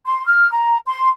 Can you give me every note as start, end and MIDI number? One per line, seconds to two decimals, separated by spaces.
0.06 0.24 84
0.27 0.50 89
0.51 0.78 82
0.86 1.08 84